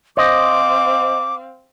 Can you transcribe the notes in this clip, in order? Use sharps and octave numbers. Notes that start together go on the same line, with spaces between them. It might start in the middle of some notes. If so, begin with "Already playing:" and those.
C4 C5 D#5 F5 D6